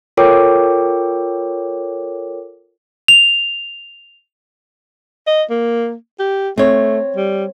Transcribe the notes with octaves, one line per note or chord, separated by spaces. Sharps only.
F4 A4 A#4 C#5 G5 D6
F7
D#5
A#3
G4
A3 C4 C#5
G3